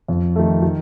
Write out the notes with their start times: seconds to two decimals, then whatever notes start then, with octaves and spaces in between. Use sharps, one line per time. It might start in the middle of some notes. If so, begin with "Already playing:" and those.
0.08 F2
0.36 D#3 A3
0.62 D#3